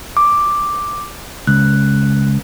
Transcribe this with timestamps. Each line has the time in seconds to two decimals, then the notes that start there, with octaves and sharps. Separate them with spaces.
0.17 D6
1.47 C#2 F#6